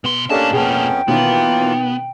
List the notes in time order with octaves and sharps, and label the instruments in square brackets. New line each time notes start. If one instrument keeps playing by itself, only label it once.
[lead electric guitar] B2 C6 [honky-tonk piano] B3
[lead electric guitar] A2 A5 [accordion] A#3 C#4 D4 [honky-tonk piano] G4 A4 D#5
[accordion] F2 B3 C#4 [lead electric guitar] B2 A#3 [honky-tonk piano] G#4 A5 [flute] G5
[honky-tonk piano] B2 D#3 C#4 [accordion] E3 A#3 F4 [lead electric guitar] B3